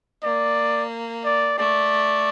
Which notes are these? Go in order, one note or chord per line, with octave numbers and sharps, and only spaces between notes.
A#3 D5
D5
A3 D5